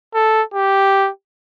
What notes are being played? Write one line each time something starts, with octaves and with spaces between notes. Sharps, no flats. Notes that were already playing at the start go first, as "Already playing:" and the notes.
A4
G4